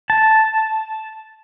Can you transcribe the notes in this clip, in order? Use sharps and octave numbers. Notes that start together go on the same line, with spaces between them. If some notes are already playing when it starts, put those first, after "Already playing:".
A5